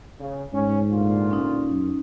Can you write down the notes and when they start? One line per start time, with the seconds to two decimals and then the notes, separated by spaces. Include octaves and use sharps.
0.20 C#3
0.53 G#2 C#4
0.92 D2 A#2 F4
1.31 C#4 D#4
1.70 F#2